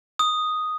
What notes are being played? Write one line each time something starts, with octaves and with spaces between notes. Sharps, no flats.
D#6